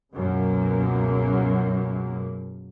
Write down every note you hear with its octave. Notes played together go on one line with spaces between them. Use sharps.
C#2 F#2 B2 A#3